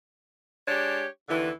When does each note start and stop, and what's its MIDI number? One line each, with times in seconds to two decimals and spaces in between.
0.68 1.06 56
0.68 1.06 62
0.68 1.06 67
0.68 1.06 73
1.29 1.51 39
1.29 1.51 50
1.29 1.51 52